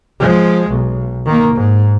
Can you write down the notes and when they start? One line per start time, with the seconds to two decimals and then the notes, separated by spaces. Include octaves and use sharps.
0.20 F3 G#3
0.70 B1
1.26 D#3 A#3
1.55 G#2